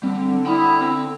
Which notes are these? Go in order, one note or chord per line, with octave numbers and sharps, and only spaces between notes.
D3 G3 C4
E4 G5 B5 D#6
C4 E6